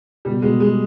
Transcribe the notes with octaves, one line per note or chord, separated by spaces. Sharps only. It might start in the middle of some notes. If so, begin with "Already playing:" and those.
B2 G3
B2 G#3
G3 G#3